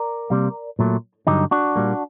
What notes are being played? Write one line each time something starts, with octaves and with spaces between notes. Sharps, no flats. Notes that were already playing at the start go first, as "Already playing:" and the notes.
Already playing: A#4 D5
C3 G3 A#3
A#2 F#3 A3
G2 D3 F#3 D#4 G4
D4 F#4
A#2 G3 A#3